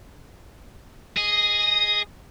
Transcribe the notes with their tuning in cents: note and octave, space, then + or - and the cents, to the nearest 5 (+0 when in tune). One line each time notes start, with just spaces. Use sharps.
G#4 +5 D#5 +0